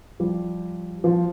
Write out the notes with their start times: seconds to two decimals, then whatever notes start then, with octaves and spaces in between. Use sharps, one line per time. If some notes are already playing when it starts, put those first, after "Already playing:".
0.20 F3 G3
1.04 F3